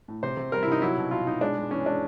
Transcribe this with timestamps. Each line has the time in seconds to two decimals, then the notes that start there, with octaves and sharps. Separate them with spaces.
0.08 A2
0.23 C3 C5
0.37 C3
0.52 G3 A#4
0.63 E4
0.67 C3 D#4
0.82 F#3 E4
0.97 B2
1.11 B2 F4
1.27 B2 D#4
1.41 G#3 D4
1.57 G#3
1.71 E3 C#4
1.86 G#3 D4